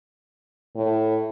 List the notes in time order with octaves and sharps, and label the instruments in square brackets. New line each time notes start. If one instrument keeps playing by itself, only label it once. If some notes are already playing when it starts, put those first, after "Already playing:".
[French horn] A2